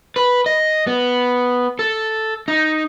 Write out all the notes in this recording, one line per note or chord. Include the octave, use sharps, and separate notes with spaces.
B4
D#5
B3
A4
D#4